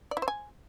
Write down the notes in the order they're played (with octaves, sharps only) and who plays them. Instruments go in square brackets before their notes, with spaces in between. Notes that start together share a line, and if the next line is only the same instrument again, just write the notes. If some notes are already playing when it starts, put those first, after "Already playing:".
[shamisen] D5
E4
C5
G#5